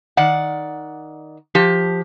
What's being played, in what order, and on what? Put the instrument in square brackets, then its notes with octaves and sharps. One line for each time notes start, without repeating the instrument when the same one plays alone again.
[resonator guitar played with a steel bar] D#3 D5 F#5
F3 G4